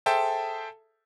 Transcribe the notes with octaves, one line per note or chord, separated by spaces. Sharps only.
G#4 A4 C5 E5 G5 A5